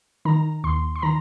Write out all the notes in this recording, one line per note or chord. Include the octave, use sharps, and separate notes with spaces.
D#3 A#5
D#2 C6
C6
D#3 A#5